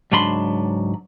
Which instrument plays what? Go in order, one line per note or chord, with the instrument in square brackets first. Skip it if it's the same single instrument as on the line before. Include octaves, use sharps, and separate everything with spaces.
[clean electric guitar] C#2 G#2 F#3 D4 B5 C6